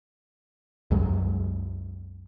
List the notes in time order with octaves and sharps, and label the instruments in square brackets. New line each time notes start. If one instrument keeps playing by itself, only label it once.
[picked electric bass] C2 F#2 F#3 G#3